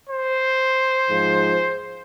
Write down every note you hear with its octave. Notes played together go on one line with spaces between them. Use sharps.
C5
G#2 F3